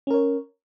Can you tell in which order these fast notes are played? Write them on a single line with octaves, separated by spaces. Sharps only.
C#4 A#4 C#5